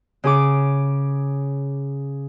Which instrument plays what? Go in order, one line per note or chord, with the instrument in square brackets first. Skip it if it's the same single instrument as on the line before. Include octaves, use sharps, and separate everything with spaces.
[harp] C#3 G#4 D6